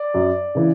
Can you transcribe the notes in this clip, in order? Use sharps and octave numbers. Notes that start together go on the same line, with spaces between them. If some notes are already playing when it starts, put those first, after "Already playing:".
Already playing: D5
F#2
C#3 E3